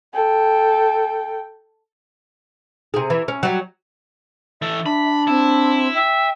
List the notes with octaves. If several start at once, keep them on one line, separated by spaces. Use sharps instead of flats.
A4 G5
C3 G#4
E3
C#4
F#3 G3
E3 A4 E5
D4 B5
C4 E4
E5 G5